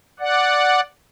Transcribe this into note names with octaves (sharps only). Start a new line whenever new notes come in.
D5 F#5